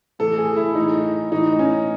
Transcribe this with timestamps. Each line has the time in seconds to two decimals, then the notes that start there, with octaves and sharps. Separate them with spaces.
0.19 A2 E3 A4
0.38 G#4
0.56 E4
0.75 A2 E3 D#4
1.31 A2 E3 D#4
1.59 C#4